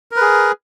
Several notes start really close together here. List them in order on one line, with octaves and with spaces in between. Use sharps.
A#4 B4 G#4